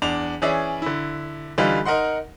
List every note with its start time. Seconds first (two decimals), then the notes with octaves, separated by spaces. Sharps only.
0.02 E2 D4 F7
0.42 E3 C#4 G#4 C#5 D5 E5
0.82 D3 E4
1.58 D3 E3 G3 D#4 F4
1.85 D#4 A#4 D#5 F#5 C6